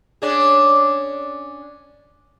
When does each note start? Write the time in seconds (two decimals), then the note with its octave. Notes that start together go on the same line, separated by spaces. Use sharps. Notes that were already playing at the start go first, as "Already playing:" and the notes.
0.22 C#4 D4 G#4